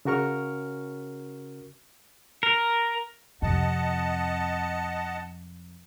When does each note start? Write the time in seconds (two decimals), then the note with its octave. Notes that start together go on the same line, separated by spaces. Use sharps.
0.05 C#3 C#4 F#4 A#4 C#6 F6
2.43 A#4
3.42 F2 C3 D#5 F#5 A5